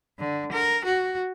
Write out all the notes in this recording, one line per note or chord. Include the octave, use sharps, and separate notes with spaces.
D3
A#4
F#4